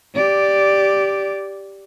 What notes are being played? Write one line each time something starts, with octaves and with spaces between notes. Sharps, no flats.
G4 D5